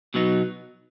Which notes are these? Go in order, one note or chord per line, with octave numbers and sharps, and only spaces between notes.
B2 F#3 B3 D#4